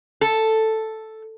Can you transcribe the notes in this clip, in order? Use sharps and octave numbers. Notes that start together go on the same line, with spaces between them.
A4